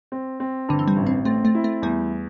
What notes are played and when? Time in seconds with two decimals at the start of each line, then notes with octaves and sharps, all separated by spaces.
0.12 C4
0.40 C4
0.69 G2 D3
0.79 E3
0.88 G3
0.96 A1
1.07 C4
1.25 A3 C4
1.45 A3
1.55 E4
1.64 A3
1.82 E2 G3